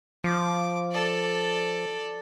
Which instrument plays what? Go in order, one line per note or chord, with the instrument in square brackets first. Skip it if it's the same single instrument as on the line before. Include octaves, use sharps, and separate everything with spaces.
[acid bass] F3 [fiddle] D6
[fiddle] A4 D5